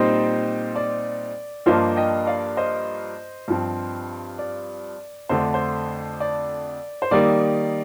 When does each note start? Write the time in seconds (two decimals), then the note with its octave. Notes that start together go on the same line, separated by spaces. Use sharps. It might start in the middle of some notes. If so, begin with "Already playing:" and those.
Already playing: A#2 G3 C4 D#4 C5
0.76 D5
1.66 G2 F3 A#3 D4 F4 C5 D#5
1.96 D#5 G5
2.27 D5 F5
2.57 C5 D#5
3.48 G2 F3 C4
4.38 D5
5.29 F2 D3 A3 D4 C5
5.54 C5
6.20 D5
7.02 C5
7.11 D#3 G3 A#3 D#4 D5